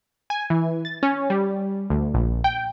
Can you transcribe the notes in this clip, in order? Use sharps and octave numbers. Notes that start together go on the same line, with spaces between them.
G#5
E3
A6
C#4
G3
D2
A#1
G5